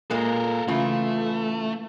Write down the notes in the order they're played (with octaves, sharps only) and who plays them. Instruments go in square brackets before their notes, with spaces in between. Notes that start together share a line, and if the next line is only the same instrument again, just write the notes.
[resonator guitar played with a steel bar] A#2 G#3 A#3 [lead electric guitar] A4 A#4
[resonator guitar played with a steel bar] C#3 E3 F4 [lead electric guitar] A3